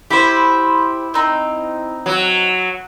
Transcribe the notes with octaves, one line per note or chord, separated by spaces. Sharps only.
E4 G4 C5
C4 D#4
F#3